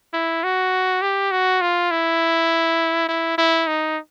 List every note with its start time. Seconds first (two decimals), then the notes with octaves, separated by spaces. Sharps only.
0.14 E4
0.44 F#4
1.02 G4
1.31 F#4
1.62 F4
1.91 E4
3.09 E4
3.38 E4
3.67 D#4